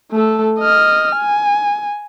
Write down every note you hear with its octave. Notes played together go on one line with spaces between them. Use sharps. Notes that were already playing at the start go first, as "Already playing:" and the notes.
A3 A4
D#5 F6
G#5